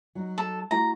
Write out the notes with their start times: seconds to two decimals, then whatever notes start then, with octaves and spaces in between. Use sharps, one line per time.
0.15 F#3 D#4
0.38 A4
0.71 A3 E4 F#4 A#5